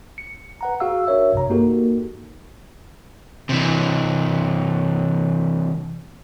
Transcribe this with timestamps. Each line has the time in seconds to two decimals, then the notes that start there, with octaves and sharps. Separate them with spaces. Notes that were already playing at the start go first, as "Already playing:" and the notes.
0.18 C#7
0.61 B4 F#5 A#5
0.80 F#4 G#4 F5 E6
1.07 D4 F#4 A#4 C#5 E5
1.33 A#1 G2 C3 C#5 A#5
1.50 A#3 D#4 F#4 G4 A4 A#4
3.49 C3 E3